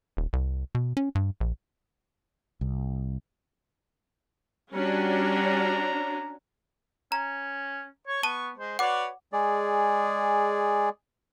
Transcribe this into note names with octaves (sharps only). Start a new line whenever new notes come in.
D#1
C2
B2
C#4
G2
A#1
C2
G3 C#4 D4 F#4 A#5
C#4 A#5
C#5 C#6
B3 A5 D#7 G7
G#3 C5
F#4 B4 C#5 D5 F#5 D6
G#3 G#4 D5